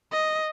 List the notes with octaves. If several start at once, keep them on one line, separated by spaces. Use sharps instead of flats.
D#5